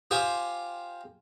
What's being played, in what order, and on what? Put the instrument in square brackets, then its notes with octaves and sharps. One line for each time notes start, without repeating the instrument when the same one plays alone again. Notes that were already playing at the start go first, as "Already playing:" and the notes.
[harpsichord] F4 G4 C5 G#5 C6